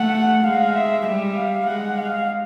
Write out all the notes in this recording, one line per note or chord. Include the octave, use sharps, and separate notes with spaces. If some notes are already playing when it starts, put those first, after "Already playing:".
Already playing: A3 F#5
G#3 F5
E5
G3 E5
F5
G#3 F#5
F5